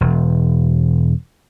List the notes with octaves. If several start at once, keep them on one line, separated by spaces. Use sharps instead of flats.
E1